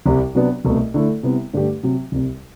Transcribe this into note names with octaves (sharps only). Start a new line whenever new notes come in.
C2 C3 G3
C3 F#3 B3 D4
C2 B2 A3
D3 A3 E4 A4
C3 G3 B3 E4
G2 D3 A3 D4 G4
C3 F#3 C4
C2 C3 G3